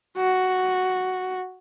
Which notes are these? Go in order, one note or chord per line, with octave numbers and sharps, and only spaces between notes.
F#4